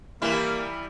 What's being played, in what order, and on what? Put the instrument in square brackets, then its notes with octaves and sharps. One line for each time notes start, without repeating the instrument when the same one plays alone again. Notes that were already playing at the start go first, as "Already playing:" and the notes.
[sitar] E3 G3 E4 [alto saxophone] A#3